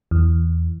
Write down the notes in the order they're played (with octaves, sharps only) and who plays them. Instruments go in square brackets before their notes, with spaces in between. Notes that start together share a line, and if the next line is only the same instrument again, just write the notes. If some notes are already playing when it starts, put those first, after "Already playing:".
[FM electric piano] E2